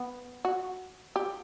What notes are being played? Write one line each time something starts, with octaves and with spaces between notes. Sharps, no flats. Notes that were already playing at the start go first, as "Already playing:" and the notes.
Already playing: B3
F#4
G4